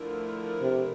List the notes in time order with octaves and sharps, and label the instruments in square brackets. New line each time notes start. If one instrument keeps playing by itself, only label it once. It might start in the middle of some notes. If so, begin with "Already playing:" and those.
Already playing: [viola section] D3 F3 A3 E4 A#4
[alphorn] C3